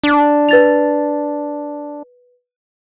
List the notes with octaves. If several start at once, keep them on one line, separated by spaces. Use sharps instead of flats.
D4
B4 A6 F7